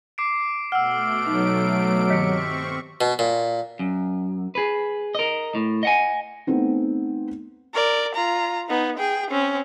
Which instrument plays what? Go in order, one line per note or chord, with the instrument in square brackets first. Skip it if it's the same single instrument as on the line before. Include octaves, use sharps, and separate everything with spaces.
[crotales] D6 C7 D7
[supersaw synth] B2 A3 D7 [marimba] F#5 [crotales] E6 F6
[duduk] F#3 [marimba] D#4
[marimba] G2 D#3 [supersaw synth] C4 C#6 [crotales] B6 C#7
[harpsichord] B2
A#2
[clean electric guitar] F#2
G#4 B4
A#4 D#5
A2
D#5 F#5 G#5
[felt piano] A3 B3 C4 D#4
[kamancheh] A#4 D5
F4 A#5
B3 D#4
G#4 G5
C4 C#4